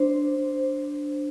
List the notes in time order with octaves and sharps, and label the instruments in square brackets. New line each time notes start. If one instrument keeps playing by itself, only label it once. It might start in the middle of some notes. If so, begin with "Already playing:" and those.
Already playing: [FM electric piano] D4 C5